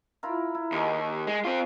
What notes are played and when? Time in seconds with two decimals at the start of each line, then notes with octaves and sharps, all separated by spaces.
0.23 E4 F4 A#4
0.55 E4
0.72 D#2 G#4 D#5
1.27 G#3
1.45 C4 F4